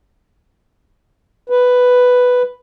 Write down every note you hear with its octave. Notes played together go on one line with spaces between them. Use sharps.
B4